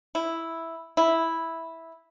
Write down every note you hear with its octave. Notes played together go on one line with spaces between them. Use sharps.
E4
E4